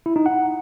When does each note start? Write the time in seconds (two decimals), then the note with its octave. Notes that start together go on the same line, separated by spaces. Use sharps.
0.06 E4
0.16 D#4
0.26 F#5